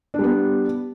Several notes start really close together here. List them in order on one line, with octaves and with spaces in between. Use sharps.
D4 G3 B3